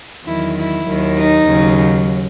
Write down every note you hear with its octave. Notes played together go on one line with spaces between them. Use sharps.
E2 D#3 F#3 E4
E4
D#2 D#3 F#3
D#4
D#2 C#3 F#3